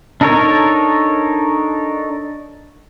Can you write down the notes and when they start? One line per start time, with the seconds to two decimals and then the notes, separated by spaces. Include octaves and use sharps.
0.21 D4 D#4 A4 A#4 C#5